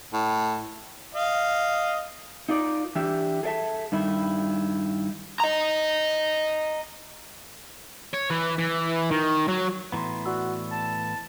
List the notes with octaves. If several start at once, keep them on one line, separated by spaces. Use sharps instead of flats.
A2
D#5 F5
D#4 F4 A#4 D5
E3 D4 G4 E5
G#4 A4 D5 E5 A5
G2 D#3 E4
D#5 A#5
C#5
E3
E3
D#3
F#3
A2 E3 B3 A#5 C6
F#4 D5 E6
A5